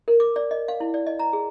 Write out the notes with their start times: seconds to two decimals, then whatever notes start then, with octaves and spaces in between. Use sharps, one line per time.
0.08 A#4
0.20 D6
0.36 D5
0.51 D#5
0.68 F5
0.80 E4
0.94 D5
1.06 D#5
1.19 A#5
1.33 G#4